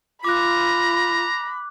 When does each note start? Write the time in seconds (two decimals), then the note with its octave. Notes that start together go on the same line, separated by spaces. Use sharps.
0.24 F4 A#5 B5 D6 F#6